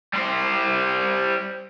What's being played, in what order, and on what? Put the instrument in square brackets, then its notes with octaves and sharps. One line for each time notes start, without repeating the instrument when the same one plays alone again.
[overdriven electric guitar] G3 C5